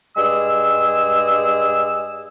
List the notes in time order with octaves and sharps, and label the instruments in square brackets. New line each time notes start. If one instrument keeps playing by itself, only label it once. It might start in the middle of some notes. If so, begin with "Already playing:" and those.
[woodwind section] G2 G#3 G#4 E6